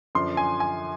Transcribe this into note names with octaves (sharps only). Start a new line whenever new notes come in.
F#2 D3 F3 C6
G#5
G#5